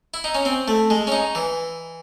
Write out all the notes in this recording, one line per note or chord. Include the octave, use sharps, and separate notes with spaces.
E4
D#4
C#4
C4
A3
G#3
C#4
D#4
E3